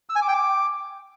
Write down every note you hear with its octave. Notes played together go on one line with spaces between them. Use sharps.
E6
G#5
D6
G5
D6